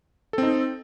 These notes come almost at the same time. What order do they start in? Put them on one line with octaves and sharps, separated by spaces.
A4 C4 D#4